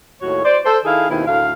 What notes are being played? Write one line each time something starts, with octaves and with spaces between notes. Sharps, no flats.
D#2 A2 F#4 C#5
C5 D5
A4 C5
D#3 E4 G#4 A4 F5
D#2 B2 D#3 C4 E4
D2 A2 F5